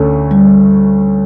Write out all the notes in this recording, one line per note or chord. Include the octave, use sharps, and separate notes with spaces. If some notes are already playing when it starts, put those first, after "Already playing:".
Already playing: D2 D3 A3 C#4
G3